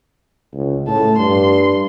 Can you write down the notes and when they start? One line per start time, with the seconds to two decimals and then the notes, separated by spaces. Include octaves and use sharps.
0.54 C#2
0.88 A2 A5
1.19 G2 C6